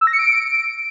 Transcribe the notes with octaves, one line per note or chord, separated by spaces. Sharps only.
E6
A#6
C#7
D7